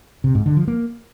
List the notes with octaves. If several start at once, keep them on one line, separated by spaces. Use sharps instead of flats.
C3
G#2
D3
F3
A#3